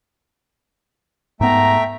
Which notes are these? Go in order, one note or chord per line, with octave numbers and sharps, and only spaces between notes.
G#2 A3 B3 E5 G5 A#5